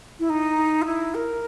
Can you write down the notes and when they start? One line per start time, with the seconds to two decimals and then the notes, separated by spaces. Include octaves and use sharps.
0.20 E4
0.30 D#4
0.82 F4
0.85 E4
1.15 A#4